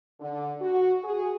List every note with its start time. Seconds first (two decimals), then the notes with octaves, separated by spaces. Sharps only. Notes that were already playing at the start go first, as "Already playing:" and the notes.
0.21 D3
0.61 F#4
1.04 G#4